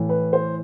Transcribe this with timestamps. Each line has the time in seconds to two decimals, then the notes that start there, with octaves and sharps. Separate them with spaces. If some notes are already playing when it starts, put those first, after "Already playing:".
Already playing: A2 E3
0.09 B4
0.33 C5